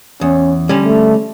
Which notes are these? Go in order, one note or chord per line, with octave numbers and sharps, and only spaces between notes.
E2 C#4
D3 G3 C#4
A3